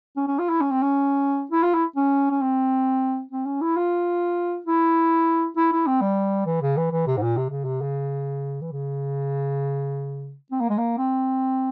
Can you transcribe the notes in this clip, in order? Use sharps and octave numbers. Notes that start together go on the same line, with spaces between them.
C#4
C#4
F4
E4
C#4
C4
C#4
E4
F4
E4
C#4
C#4
C4
C4
C#4
E4
F4
E4
E4
E4
C4
G3
E3
C#3
E3
E3
C3
G#2
A#2
C3
C#3
C3
C#3
E3
C#3
C4
A#3
G#3
A#3
C4